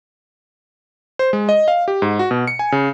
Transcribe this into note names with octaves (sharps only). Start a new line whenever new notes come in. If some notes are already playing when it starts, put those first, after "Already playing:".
C5
G#3
D#5
F5
G4
G#2
F#4
B2
C#7
G#5
C#3